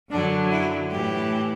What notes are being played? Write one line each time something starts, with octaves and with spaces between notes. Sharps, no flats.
F#2 D3 F#3 D4
E4
A2 E3 G4